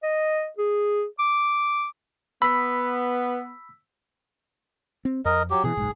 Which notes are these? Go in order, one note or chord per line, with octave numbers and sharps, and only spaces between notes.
D#5
G#4
D6
B3 B5 E6 B6
C4
F2 A#4 D#5
F#3 G4
B2 E3 G#4
F#1 B1 G#2